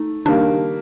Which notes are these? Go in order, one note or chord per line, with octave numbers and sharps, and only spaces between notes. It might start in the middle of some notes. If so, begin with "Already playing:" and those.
Already playing: A3 D#4
D#3 G3 A#3 D4